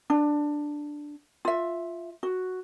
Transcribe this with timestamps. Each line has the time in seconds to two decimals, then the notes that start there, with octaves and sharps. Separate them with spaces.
0.10 D4
1.45 F4 E5
2.23 F#4